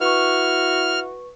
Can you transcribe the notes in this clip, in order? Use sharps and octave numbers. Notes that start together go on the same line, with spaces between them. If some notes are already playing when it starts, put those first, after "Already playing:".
E4 F#4 B4 C#6 F6